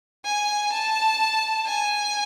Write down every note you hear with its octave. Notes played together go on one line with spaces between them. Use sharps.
G#5
A5
G#5